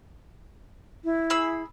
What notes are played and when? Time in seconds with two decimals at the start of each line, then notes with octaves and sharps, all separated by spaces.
1.04 E4
1.30 G#4 B5 E6